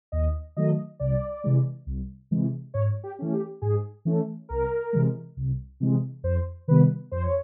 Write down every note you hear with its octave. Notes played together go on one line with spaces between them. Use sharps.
D#2 D#5
D#3 F#3 A3 D#5
C2 D5
C3 E3 G#3
C2
C3 E3 G#3
G#2 C#5
G4
E3 A3 C#4
G4
G#2 G#4
E3 A3 C#4
C2 A#4
C3 E3 G#3
C2
C3 E3 G#3
F2 C5
C3 D#3 G3 B3 B4
F2 C5
C#5